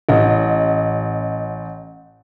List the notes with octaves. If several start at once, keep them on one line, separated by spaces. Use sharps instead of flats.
A1 D#5